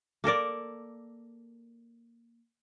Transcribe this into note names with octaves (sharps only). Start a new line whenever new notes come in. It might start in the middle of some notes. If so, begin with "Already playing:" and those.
A#3 A4 A#4 D5